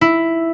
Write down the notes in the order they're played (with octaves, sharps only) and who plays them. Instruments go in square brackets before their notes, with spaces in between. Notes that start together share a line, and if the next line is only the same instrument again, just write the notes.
[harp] E4